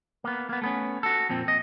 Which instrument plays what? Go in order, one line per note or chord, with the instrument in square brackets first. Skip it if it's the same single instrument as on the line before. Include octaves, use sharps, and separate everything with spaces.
[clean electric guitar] A#3 B3
A#3 B3
A3 B3 C#4
F#4 A4
F2 A#2 C4
D#5